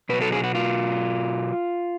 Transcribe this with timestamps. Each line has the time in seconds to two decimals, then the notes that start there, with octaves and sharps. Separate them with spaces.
0.09 B2 F#3 B4
0.21 A4
0.32 G#4
0.44 F#4
0.55 F4